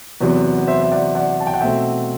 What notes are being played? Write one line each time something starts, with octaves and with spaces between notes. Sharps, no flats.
E2 C3 F#3 B3 B4
C5 E5
E5
D5 F#5
D5 F#5
A5
G5
F#5
B2 A3 C4 E5 G5